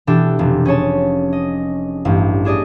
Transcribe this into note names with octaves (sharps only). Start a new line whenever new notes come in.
B2 E3 D4 G4 A4
F1
C#4 G#4 C#5 A5
D#5
A1 G2
D4 G#4 D5 D#5